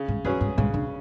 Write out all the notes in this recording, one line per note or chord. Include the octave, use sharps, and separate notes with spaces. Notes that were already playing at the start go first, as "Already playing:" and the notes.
Already playing: C#3
G#2
F#2 F#3 C#4 G#4 B4
G#2
G#2 C#3
D3